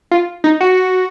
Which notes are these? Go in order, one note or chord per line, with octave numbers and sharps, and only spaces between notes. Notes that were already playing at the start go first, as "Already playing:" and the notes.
F4
D#4
F#4